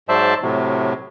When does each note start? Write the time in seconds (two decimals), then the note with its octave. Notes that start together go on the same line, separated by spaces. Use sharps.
0.09 G#2 F#3 C5 D5 E5 A5
0.43 A2 C3 F#3